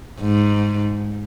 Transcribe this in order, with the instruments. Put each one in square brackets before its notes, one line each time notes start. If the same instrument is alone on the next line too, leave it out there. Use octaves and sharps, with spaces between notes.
[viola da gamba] G#2